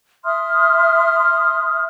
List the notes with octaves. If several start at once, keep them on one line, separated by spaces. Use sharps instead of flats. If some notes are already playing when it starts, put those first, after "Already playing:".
E5 C6 D#6 F6